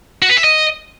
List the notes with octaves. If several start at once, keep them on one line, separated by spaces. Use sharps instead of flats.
F#4
B4
E5
D#5